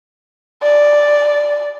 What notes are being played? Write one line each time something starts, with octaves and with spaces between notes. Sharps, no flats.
D5